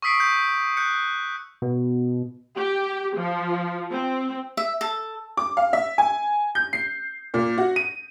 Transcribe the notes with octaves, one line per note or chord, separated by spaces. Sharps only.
C#6 D#6 E6 B6 C7 D7
G6
F#6 G6 C#7
B2
G4
F3
C4
E5
A4
D6
F5
E5
G#5
G6
C7
A#2
F#4
D#7